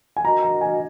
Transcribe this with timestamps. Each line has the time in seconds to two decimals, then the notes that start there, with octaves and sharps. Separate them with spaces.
0.17 G#5
0.25 F#4 A#4 D#5 A#5
0.43 A#5
0.61 G#5